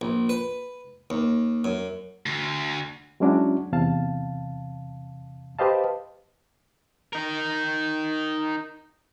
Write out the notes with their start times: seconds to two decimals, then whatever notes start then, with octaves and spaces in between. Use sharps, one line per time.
0.01 A#1
0.29 B4
1.10 D#2
1.64 F#2
2.26 D2
3.20 F#3 G#3 C#4 D4 E4 F#4
3.72 E2 C3 F5 A5
5.59 G4 B4 C5 D#5 F5 A5
7.13 D#4 A#4